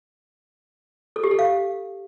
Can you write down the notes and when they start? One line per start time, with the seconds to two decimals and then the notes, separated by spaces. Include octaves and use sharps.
1.16 A4
1.24 G4
1.31 A4
1.39 F5